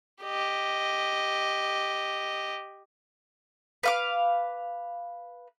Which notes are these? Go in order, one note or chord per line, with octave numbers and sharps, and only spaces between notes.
G4 D#5
B4 F5 D6